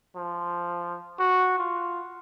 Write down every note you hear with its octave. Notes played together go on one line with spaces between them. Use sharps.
F3
F#4
F4